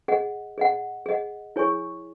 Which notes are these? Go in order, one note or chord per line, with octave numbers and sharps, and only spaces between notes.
G#4 D#5 F#5
G#4 D#5 F#5
G#4 D#5 F#5
E4 G#4 C#5 G#5 C#6